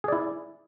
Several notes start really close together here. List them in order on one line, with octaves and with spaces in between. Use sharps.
G#4 D5 E4